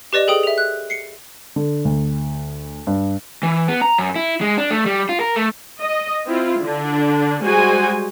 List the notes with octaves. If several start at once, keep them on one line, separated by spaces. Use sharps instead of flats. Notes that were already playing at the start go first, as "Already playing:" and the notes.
G4 B4 D5 D#5
G#4 A4 G5 D#6
E5 F7
F#6
C7 C#7
D3
D2
G2
E3
B3
A#5
F#2
E4
G#3
D4
A3
G3
F4
A#4
A3
D#5
C4 E4 F4
D3 D4
G3 G#3 F#4 C5 G#5